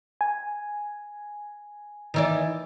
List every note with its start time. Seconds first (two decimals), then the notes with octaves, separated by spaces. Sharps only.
0.21 G#5
2.14 D#3 E3 D5